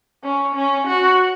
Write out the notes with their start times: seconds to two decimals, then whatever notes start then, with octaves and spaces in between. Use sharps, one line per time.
0.24 C#4
0.55 C#4
0.87 F#4